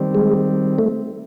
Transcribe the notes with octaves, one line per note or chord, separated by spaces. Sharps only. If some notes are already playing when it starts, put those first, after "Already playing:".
Already playing: D#3 G3 C4
G#3
A3